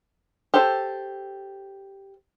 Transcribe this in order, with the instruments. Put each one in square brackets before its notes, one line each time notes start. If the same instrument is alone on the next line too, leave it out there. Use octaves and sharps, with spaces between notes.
[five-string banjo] G4 A4 C5